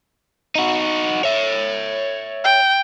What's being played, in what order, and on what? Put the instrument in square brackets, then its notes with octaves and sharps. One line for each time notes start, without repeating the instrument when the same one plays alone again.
[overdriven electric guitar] D#4 F#4
C#5 E5
[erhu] G5